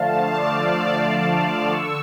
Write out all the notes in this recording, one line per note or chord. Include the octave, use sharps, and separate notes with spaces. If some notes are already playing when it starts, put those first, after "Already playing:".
Already playing: D3 F3 A3 F5 A5
D5 F5
D5 F5
D3 C#6 E6